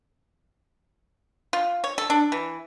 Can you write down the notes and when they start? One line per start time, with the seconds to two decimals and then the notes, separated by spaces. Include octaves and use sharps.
1.53 F4
1.84 C#5
1.98 A4
2.10 D4
2.32 E3